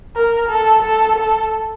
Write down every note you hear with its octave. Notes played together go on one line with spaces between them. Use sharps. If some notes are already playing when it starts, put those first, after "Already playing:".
A#4
A4
A4
A4